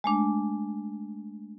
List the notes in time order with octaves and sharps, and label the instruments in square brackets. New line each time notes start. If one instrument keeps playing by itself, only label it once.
[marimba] G#3 A3 D4